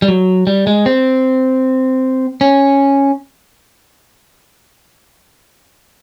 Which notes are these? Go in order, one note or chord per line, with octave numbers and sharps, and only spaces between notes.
G3
F#3
G3
G#3
C4
C#4